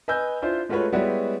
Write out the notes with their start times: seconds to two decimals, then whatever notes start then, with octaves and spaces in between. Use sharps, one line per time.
0.08 B4 D#5 G#5 E6 G6
0.42 D4 E4 F4 C5
0.69 G#3 A3 F4 F#4 B4 C#5
0.93 G3 G#3 B3 E4 F#4 C#5